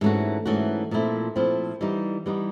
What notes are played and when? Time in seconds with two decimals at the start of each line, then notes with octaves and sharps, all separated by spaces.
0.01 G#2 E3 A3 C#4 F#4
0.46 G#2 E3 A3 C#4 F#4
0.91 A#2 F3 A3 C4 E4
1.36 A#2 F3 A3 C4 E4
1.81 E3 G3 B3 D#4
2.26 E3 G3 B3 D#4